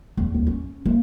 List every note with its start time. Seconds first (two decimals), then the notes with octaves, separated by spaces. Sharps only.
0.17 E2
0.34 D#2
0.47 C#4
0.86 A#3